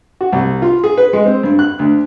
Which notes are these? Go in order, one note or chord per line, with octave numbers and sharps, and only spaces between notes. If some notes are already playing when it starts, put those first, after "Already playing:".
F#4
C2
F4
G#4
B4
G#3
C4
G2
F#6
D2